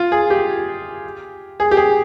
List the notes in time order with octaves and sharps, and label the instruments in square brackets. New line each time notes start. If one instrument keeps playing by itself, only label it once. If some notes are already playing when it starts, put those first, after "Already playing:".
Already playing: [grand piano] F4
G#4
G4
G#4
G4
G#4